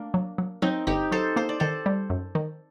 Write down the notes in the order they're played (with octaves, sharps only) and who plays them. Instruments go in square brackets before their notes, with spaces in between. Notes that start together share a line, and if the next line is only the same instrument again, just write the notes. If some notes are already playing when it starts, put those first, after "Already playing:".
Already playing: [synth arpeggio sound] A3 [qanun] A#3 D4
[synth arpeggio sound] F#3
F#3
[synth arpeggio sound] F#3 [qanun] C4 D#4
[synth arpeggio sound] G1 [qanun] D#4 G4
[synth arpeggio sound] F#3 [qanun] A4 C5
[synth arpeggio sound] A#3 [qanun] C5
[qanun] D5
[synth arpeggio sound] D#3 [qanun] A4 C5
[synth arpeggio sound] G3
F#2
D#3